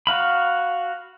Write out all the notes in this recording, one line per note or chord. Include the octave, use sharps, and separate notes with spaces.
F#4 F5 B5